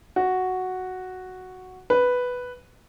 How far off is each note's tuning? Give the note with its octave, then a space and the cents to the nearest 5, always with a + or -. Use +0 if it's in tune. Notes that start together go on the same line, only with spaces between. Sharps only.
F#4 +0
B4 +0